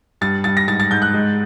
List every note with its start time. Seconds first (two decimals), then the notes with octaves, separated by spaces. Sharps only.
0.21 G2 A6
0.44 G2 A6
0.57 A#6
0.68 G#2 A6
0.80 A6
0.91 G#2 G6
1.02 F#6
1.14 G#3